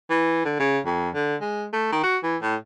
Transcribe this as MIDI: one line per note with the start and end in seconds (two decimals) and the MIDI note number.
0.10 0.43 52
0.45 0.57 50
0.59 0.79 49
0.86 1.09 41
1.14 1.36 50
1.41 1.66 56
1.73 1.91 57
1.92 2.00 51
2.04 2.17 66
2.23 2.37 52
2.42 2.55 45